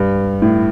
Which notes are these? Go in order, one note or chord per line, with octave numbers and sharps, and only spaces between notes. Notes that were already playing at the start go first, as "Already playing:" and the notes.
Already playing: G2
A2